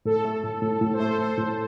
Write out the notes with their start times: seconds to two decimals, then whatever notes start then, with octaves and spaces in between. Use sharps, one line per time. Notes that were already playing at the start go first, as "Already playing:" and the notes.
0.05 A2 A4
0.25 A3
0.44 A2
0.62 A2
0.81 A2
0.93 C5
1.00 A3 A4
1.17 A2 C5
1.38 A2